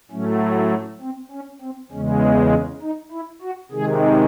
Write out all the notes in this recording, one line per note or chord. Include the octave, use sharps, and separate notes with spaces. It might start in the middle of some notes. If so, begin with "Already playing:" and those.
A2 F#3 A3 C#4
C#4
C4
C#4
C4
E2 C#3 G#3 C#4
C#4
C#4
D#4
E4
F#4
C3 D#3 G#3 G#4